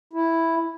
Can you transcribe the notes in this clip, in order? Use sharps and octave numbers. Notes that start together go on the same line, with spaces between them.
E4